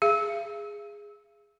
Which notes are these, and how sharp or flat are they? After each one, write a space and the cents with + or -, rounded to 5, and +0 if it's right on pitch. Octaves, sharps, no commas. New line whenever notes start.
G#4 -5 F5 -45